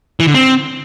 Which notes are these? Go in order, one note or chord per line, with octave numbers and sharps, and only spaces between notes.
E3
D3
C4